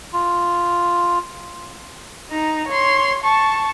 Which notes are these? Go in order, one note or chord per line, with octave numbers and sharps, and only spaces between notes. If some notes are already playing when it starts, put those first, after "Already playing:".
F4
D#4 A#5
C#5 C6
A5 C#6